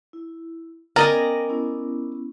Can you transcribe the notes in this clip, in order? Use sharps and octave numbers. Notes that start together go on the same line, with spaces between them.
E4
B3 C#4 A#4 D5 D#5 G5 G#5
B3 C#4 E4